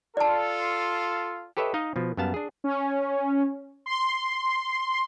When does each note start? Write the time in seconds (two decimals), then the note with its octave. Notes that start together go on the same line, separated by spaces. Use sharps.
0.17 F4 A4 D5 A5
1.57 G4 A4 B4 C#5 D#5 E5
1.74 D#4 D#5 F5
1.96 B2 F3
2.17 F#2 G3 B3 F5 A5
2.34 D4 G#4
2.64 C#4
3.86 C6